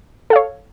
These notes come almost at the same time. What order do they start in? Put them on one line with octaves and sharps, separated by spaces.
A4 F5 C#5